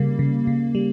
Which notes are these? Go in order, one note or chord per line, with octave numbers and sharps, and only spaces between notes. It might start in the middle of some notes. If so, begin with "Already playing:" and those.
Already playing: C#3 G3 A#3
C#3
C#3
G3